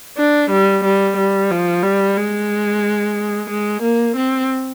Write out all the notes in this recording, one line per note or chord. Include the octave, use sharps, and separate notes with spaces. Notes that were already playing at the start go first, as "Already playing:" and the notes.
D4
G3
G3
G3
F3
G3
G#3
G#3
A#3
C4